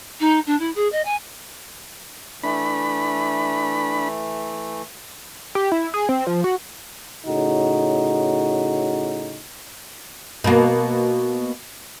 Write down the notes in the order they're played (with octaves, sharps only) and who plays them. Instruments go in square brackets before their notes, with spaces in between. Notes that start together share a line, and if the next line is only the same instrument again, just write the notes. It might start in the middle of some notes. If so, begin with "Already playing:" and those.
[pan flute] D#4
D4
E4
G#4
D#5
G#5
[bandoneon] E3 A3 [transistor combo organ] D4 B5
[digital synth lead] G4
E4
G#4
C4
F3
F#4
[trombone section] A2 C#3 D#4 F#4
[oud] B2 A#3